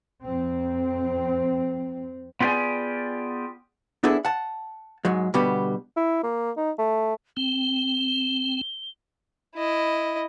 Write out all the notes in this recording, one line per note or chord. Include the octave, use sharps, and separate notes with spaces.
F2 C4
B3 F4 G4 G#4 D5 G#5
B3 D4 E4 G#4 A4
F#5 A5
G#2 F#3 G#3
B2 D3 G3 B3 F#4 G4
E4
A#3
D#4
A3
C4 G7
E4 D#5